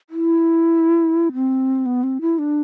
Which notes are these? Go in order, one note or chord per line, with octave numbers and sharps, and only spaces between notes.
E4
C4
B3
C4
E4
D4